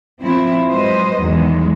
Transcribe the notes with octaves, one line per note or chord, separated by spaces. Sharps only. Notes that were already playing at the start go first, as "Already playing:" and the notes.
F3 C4 E4
F#3 G#3 B4 C5 D#5
E2 D#3 F#3 G#3